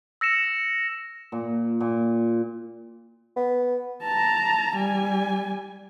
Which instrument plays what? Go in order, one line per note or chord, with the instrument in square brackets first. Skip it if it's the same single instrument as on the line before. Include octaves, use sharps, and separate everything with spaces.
[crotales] E6 A#6 C#7 E7
[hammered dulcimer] A#2
A#2
[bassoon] B3
[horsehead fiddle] A5 A#5
G3 G#5